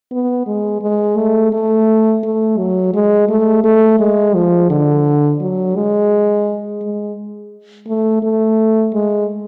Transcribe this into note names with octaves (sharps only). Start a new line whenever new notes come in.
B3
G#3
G#3
A3
A3
A3
F#3
G#3
A3
A3
G#3
F3
D3
F#3
G#3
G#3
A3
A3
G#3